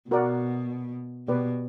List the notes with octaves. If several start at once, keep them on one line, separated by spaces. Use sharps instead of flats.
B2 F#4 A#4 D5 F#5
B2 G4 B4 D5